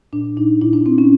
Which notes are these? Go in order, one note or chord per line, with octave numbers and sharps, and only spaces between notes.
A#2 D4
A#2 D#4
A#2 E4
D4
A#2 C4
C#4